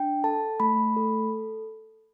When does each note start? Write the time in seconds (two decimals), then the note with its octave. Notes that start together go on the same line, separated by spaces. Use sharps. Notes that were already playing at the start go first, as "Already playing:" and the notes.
Already playing: D4 G5
0.24 A4 A5
0.60 A3 B5
0.96 A4